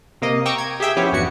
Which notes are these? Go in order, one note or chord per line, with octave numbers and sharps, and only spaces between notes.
C3 A#3 D#5
G5 A#5 C#6 D6 E6
G#6
G4 G#4 E5 G5
F3 B3 C#4 E4 G4 C#5
G1 E2 D3 F#4 C#7